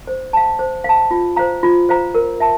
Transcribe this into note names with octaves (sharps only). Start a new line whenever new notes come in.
C5
F5 A5
C5
F5 A5
F4
C5 F5 A#5
F4
C5 F5 A#5
A#4
E5 A5